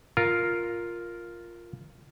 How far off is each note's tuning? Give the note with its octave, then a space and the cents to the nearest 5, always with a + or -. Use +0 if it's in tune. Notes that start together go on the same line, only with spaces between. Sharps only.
F4 +0 A#4 +0